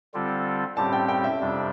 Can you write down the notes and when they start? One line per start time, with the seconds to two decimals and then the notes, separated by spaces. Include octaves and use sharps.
0.14 D3 G3 C4 F4 A4
0.77 A2 G3 C4 G4 A5
0.92 G5
1.09 G5
1.24 E5
1.40 F2 C3 G3 D4